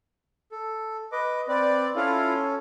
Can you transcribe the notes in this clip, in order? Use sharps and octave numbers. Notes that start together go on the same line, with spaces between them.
A4
B4 D#5 D6
C4 B4 D5
C#4 E4 F4 A4 F5